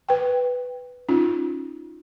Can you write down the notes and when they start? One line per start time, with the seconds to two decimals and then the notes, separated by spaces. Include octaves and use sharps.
0.09 B4 G5
1.09 C#4 D#4 F4